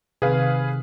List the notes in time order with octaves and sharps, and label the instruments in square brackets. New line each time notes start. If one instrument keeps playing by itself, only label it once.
[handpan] C3 D#3 C4 [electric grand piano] G#4 B4 F5